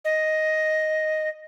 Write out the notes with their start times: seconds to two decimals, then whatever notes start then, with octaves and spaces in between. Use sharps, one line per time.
0.05 D#5